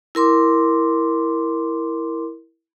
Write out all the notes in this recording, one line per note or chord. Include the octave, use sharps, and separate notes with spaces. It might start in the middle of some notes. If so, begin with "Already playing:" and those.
E4 A#4 C6 D6